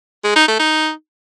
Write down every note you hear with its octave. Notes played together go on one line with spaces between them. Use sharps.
G#3
D#4
A3
D#4